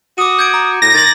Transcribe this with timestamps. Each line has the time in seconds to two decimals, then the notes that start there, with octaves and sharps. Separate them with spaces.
0.18 F#4 D6 D#6 D#7
0.39 G6 G#6 D7
0.54 A#5
0.82 A2 A#6
0.94 D#3 G#6 A6 F#7